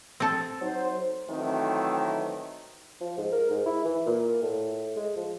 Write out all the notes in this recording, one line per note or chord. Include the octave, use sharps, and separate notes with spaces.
C4 A4
F#3 D#4 C5
D#3 E3 F#3 A3 C4
F3
G#2
A#4
G#2
E4
E3
A#2
A2
G#3
F3